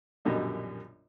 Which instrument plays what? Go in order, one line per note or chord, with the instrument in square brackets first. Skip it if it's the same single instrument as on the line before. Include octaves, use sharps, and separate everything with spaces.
[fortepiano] A#1 F#2 B2 D3 G3 D#4